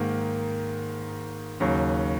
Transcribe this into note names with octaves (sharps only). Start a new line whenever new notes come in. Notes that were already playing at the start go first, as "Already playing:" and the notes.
Already playing: G#2 D#3 A#3
D#2 C#3 F#3